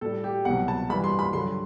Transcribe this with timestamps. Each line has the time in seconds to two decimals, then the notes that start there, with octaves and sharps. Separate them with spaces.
0.01 A2 G3 A4
0.24 G4
0.45 C2 B2 F#3 F#5
0.68 A5
0.89 G2 E3 G3 B5
1.04 C6
1.19 B5
1.33 G2 D3 F#3 C6